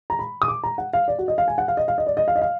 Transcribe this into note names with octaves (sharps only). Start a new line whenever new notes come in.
A#5
B5
D#6
D6
A#5
F#5
F5
D5
F#4
D#5
F5
G#5
F#5
F5
D#5
F5
D#5
D5
D#5
F5
D#5
F5